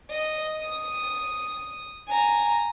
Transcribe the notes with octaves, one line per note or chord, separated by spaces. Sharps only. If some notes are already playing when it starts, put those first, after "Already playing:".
D#5
D#6
G#5 A#5